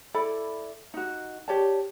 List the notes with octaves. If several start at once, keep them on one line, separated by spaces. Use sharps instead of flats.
E4 A4 D5 B5
D#4 F#4
G4 C#5 D5 A5